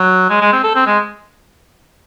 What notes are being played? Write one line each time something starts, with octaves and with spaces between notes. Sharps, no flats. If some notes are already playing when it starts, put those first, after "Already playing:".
Already playing: F#3
G#3
G#3
C4
A4
C4
G#3